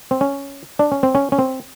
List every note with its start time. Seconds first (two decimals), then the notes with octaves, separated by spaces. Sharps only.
0.11 C4
0.21 C#4
0.79 D4
0.92 C#4
1.03 C4
1.15 C#4
1.32 C#4
1.39 C4